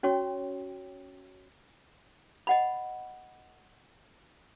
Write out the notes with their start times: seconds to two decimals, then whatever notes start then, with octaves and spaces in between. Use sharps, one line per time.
0.03 C#4 F#4 C#5 G5 C#6
2.47 D#5 F#5 B5